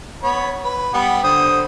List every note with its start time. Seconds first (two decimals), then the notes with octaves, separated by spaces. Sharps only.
0.23 B3 C#5 B5
0.64 B4
0.94 G3 B3
1.24 D3 C5 D#6